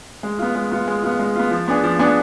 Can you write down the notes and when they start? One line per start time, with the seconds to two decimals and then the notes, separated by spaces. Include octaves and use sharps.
0.23 G#3
0.39 B3 F4
0.55 G#3
0.71 B3 F4
0.88 G#3
1.03 B3 F4
1.19 G#3
1.36 B3 F4
1.51 F3
1.68 B3 D4 G#4
1.84 F3
1.99 B3 D4 G#4